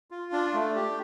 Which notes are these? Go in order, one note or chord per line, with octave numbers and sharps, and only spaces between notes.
F4
D4
A3
G4